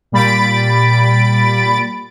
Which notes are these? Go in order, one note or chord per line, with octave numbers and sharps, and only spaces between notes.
A#2 G3 B5 A6 D7